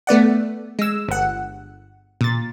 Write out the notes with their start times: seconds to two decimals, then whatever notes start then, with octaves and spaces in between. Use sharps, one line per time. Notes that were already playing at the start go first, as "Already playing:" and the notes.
0.07 A3 B3 D5 F#5
0.79 G#3 E6
1.09 G1 F#5
2.21 A#2 A6